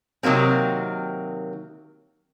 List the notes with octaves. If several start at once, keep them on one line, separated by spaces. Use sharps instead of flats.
C3 D#3 F#3 A#3 C4